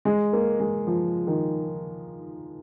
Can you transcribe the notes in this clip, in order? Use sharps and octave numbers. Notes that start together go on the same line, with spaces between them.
G#3
A#3
G#3
F3
D#3